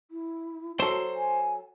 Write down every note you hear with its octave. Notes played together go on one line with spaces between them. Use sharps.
E4
F#3 F#4 A4 C5 C6
G#5